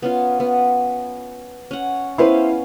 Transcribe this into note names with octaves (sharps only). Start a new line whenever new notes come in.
B3 C#4 F4
B3
C#4 F#5
B3 C#4 E4 C5 F5